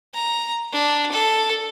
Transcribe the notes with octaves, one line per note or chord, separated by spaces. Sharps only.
A#5
D4
A4